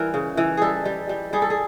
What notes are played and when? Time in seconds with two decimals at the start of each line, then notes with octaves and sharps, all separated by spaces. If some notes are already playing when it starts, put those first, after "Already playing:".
Already playing: E3 G3 A#4
0.14 C#3
0.37 E3
0.57 G3 G#4 A4
0.85 G3
1.09 G3
1.33 G3 G#4
1.42 A4
1.50 G#4